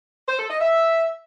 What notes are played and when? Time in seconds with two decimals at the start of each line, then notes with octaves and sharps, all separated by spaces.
0.28 C5
0.39 A4
0.49 D#5
0.60 E5